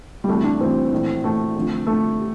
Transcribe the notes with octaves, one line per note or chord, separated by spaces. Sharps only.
G3
D2 C3 E3 A3
D4
D2 C3 E3 C4
A#1 A2 E3
A#1 A2 E3 A3
F2 D3 F3
F2 D3 F3 A3
G4